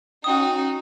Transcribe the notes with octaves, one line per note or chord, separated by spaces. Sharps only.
C#4 D#4 F#4 G5 D#6